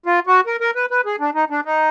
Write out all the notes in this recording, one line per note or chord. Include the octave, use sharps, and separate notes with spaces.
F4
F#4
A#4
A#4
B4
B4
G#4
D4
D#4
D4
D#4